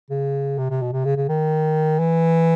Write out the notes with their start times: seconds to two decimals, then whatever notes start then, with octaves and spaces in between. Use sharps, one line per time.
0.10 C#3
0.58 C3
0.70 C3
0.82 B2
0.92 C3
1.05 C#3
1.17 C#3
1.29 D#3
1.99 E3